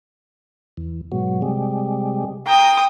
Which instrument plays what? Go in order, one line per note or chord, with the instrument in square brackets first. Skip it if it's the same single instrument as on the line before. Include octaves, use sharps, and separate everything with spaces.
[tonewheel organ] E2
G#2 B2 F#3
C3 G3 G#3
[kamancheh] G5 D#6 [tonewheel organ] A#5